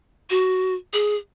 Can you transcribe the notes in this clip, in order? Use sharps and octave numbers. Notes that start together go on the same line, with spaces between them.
F#4
G#4